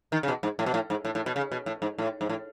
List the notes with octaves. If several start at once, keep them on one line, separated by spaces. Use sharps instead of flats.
D#3
C#3
B2
G#2
A2
B2
A2
G#2
A2
A2
B2
C#3
B2
A2
G#2
A2
G#2
A2